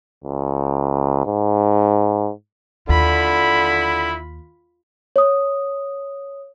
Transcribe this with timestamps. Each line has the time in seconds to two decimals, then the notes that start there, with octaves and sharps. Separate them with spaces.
0.24 C#2
1.26 G#2
2.89 D#2 D3 E4 F4 B5
5.16 C#5 D#6